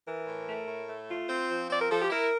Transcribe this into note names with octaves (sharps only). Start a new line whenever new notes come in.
E3 A#4
A2
A3
A2
A3
F4
C4 C5
F3
C4 D5
A#4
F3 A4
G4
E4 A#4